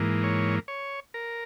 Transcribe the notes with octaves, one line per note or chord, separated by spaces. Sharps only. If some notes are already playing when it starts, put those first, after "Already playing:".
Already playing: G#2 E3 A#3
C#5
C#5
A#4